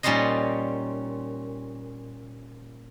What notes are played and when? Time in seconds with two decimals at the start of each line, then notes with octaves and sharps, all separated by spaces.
0.03 A#2 G3 C#4 D#4 C5 D#5